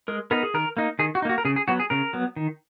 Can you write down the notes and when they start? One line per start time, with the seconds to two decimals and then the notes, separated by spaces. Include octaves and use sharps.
0.08 G#3 A#4
0.31 B3 D#4 A#4
0.43 G#4
0.54 D#3 A#4
0.77 A#3 D#4
0.99 D#3 G#4
1.15 F#4
1.22 D#4
1.25 A#3 F#4
1.38 A#4
1.45 C#3 G#4
1.56 G#4
1.68 F#3 B3 F#4
1.80 G#4
1.90 C#3 A#4
2.13 F#3 B3
2.36 D#3